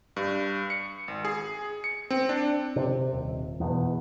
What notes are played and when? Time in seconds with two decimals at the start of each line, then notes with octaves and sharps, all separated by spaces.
0.16 G2
0.70 C#7
1.08 G#1
1.25 G#4
1.84 C#7
2.10 C4
2.29 D4
2.76 C3
3.13 D#1
3.60 E2 B2